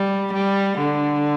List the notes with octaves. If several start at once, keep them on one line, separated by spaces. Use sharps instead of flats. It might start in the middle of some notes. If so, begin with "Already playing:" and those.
Already playing: G3
G3
D3